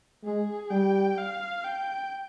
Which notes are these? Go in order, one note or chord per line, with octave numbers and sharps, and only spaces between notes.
G#3 G#4
G3 G5
F5
G5